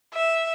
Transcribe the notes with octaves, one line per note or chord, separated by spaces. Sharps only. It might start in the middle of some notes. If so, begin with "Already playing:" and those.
E5